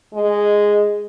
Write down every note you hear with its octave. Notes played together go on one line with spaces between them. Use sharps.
G#3